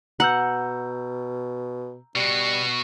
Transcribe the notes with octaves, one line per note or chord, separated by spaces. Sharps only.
B2 F#5 A#5 E6 G6
B2 G3 F#4